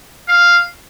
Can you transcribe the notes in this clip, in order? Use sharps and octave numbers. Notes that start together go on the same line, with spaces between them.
F5